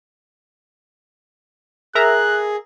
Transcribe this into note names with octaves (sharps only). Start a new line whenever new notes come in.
G#4 A#4 E5 A#5 F#6